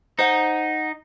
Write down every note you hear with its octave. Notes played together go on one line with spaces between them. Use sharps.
D#4 C5 F#5